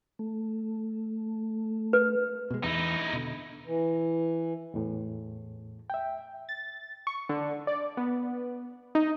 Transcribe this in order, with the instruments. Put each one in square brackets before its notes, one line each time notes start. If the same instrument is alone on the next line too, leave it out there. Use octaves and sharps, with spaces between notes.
[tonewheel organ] A3
[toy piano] B4
[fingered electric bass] B2 G#3
[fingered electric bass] E2 [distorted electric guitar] D#4 E4
[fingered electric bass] B2 D3
[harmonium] E3
[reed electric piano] E2 A2
E5 G5
[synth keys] A6
C#6
D3
D5
B3
D#4